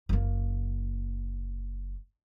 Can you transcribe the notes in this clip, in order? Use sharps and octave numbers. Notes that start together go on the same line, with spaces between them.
F#1 A#3